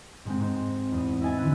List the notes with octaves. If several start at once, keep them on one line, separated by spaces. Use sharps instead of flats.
G#2 G#3 C4
G#2 C4
E2 D#6
E4 D#5 G#5 A6
D3 E4 F#6